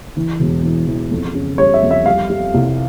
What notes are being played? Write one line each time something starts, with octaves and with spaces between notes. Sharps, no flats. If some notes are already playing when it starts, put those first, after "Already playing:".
E3
E1
E3
E3
F2
C#3
G3 C#5
E5
F2
E5
G3 F5
G3
C2